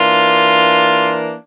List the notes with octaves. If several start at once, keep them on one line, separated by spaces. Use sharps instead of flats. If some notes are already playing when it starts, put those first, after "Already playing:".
Already playing: E3 A#3 D4 F4